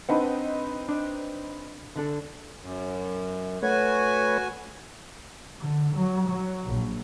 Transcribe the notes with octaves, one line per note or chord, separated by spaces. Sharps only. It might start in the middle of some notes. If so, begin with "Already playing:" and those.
C4 D4 D#4 B4 F#5
D4
D3 D4 A4
F#2
A3 F#4 B4 C#5 G#5
D3
F#3
F#3
A#1